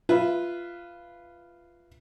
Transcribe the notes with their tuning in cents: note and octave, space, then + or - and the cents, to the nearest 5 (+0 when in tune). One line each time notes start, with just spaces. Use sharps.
F4 -10 B4 +0 E5 +0